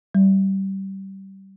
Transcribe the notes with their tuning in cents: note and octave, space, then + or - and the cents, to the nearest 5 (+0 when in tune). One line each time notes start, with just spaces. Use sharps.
G3 -20